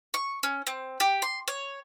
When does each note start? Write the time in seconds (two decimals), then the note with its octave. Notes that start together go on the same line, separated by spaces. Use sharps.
0.14 C#6
0.43 C#4
0.67 C4
1.00 G4
1.22 C6
1.48 C#5